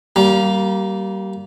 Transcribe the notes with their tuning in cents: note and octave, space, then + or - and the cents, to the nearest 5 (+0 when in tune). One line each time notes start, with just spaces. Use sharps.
G3 -30 A#3 +0